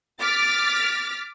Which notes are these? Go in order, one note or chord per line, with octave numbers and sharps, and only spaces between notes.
D6 F6 A6 B6